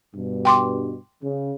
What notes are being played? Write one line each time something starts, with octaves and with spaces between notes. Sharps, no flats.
G2 B2
G5 C6 D6
C#3